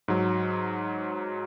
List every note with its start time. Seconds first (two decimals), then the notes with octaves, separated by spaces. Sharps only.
0.08 G#2 F#3